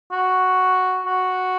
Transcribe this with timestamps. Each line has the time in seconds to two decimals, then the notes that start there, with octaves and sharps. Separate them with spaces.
0.12 F#4
1.06 F#4